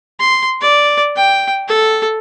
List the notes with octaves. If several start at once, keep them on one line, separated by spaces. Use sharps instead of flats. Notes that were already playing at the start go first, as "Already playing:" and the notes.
C6
D5
G5
A4